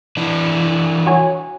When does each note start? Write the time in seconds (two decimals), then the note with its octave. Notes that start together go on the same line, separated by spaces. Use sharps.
0.17 E3 D4
1.07 F#4 C#5 G#5